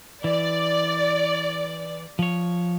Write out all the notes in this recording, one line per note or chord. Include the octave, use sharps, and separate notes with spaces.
E3 D5
F3 C#5